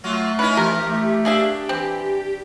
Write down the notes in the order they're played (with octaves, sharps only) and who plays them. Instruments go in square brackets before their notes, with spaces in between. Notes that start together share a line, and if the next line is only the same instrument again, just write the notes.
[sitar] F#3 F4 F#4 [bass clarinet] A3
[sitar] C#4 D#4 E4 [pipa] B4
[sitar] E3 [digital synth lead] G4 [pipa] A#4
[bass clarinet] A3
[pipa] A#3 G#4 E5 [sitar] D4
[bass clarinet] E3 [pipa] C4